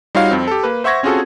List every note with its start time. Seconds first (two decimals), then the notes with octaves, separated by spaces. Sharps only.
0.15 G3 D#4 F4 F#4 C#5 F5
0.31 F2 C4
0.47 G4 A4
0.64 A#3 B4
0.84 C5 E5 F#5 C#6 G#6 A#6
1.03 C4 C#4 F4 F#4 G#4 A4